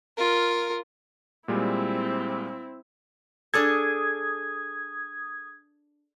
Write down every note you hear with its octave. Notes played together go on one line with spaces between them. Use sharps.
F4 A#4
A#2 G3 G#3 C4 E4
D4 G#4 A4 D#6 G#6